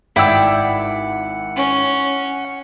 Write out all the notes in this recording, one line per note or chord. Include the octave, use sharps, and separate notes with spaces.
G#1 E4 D5 F#5 G5 E6
C#4